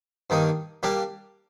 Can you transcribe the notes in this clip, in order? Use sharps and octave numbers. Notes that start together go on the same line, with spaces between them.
G2 D#3 A#3 D#4
G3 A#3 D4 G4